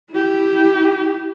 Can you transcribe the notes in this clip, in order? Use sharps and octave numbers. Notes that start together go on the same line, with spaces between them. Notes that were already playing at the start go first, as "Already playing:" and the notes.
E4 G4